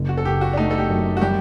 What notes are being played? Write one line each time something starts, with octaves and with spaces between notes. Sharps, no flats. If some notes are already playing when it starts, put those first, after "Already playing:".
Already playing: F#1
F#4
A4
F#1 G4
F#4
D4
A3 D#4
A4
G4
F#2
F#4
G3 G4